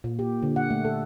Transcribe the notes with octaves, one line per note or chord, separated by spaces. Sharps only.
A#2
G4
D3
F#5
A3
A4